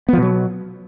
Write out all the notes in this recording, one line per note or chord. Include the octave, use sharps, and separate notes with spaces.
B2 F3 F#3 B3